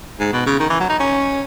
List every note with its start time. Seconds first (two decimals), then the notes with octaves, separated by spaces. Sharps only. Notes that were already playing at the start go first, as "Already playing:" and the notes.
0.20 G#2
0.33 B2
0.46 C#3
0.60 D#3
0.70 E3
0.80 F#3
0.89 D#4
1.00 C#4